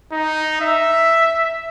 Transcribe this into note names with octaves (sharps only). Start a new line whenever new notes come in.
D#4
E5